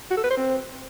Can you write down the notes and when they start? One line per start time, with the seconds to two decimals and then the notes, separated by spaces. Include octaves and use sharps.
0.10 F#4
0.17 A4
0.24 B4
0.30 C5
0.37 C4